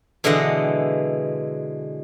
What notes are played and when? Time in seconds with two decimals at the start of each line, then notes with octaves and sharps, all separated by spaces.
0.24 B2 D3 E3 G#3 D#5 F#5